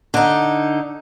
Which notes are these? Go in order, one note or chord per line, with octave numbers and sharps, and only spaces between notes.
D3 D#4